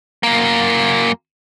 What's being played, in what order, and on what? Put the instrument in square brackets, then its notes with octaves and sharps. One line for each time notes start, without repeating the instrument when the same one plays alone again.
[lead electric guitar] F#2 A#3